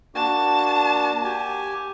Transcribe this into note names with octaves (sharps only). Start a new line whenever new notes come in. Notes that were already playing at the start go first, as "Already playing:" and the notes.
A#3 D4 F#4 A5
G4 G#5